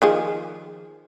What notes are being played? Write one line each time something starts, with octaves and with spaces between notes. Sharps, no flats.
D#3 F3 G#4